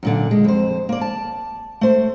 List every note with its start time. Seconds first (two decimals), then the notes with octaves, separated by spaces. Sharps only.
0.03 F#2 A#2 D3
0.31 G#3
0.44 F2 C5
0.89 A#3 D5
1.01 A5
1.81 A3 C5